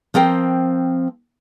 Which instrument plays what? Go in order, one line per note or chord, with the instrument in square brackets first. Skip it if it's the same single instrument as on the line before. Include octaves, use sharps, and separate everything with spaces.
[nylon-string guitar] F3 C4 A#4 G5